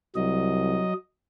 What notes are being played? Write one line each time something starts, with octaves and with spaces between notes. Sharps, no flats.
C2 F#3 D#5